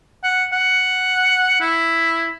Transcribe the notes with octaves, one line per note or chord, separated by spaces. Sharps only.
F#5
F#5
E4